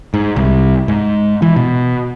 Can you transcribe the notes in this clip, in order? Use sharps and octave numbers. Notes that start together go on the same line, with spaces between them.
G#2
C2
G#2
E3
B2